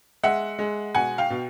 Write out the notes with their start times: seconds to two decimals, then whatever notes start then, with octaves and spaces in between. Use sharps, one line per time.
0.23 G#3 E5 F#5
0.59 G#3
0.95 B2 F#5 G#5
1.18 F5 G5
1.30 B2